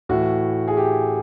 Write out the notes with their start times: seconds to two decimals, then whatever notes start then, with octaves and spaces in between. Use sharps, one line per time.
0.09 A2 E3 F#4
0.68 G#4
0.77 G4